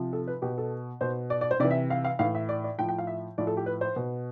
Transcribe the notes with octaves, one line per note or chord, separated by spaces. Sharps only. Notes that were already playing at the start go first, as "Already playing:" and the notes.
Already playing: C3 F3
A4
B4
B2 G4
A4
B2 C5
D5
D5
C5
C3 E3 D5
E5
F5
F5
A2 E3 F5
E5
D5
D5
A2 F3 G5
G5
F5
E5
A2 F3 D5
A4
G4
B4
C5
B2